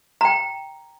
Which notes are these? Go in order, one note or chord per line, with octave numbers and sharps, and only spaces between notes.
G5 A#5